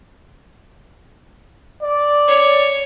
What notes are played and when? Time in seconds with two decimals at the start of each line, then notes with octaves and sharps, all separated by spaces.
1.82 D5
2.28 C#5